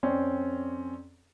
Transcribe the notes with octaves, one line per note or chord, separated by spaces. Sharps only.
F2 C4 C#4 D5 C6